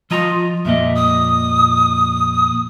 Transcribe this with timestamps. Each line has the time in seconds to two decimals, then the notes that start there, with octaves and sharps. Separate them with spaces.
0.11 F3 F4 D#5 A#5
0.65 F2 A#2 D#5 E5
0.95 D#6